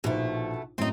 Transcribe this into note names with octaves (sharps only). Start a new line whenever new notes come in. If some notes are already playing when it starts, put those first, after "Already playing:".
A#1 B2 A3 D#4 C5
F#2 A2 C4 D#4